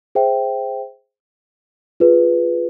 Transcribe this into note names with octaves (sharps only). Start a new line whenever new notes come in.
G#4 C5 E5 G5
F4 G#4 B4